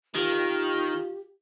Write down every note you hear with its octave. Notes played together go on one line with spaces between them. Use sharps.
D#3 F4 G4